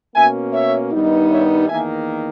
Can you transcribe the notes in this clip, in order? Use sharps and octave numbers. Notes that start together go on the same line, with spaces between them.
B2 A#3 C#4 E5 G#5
C#5 E5
G2 D#3 G3 B3 D#4
C#5 E5
E2 D#3 A#3 E5 G#5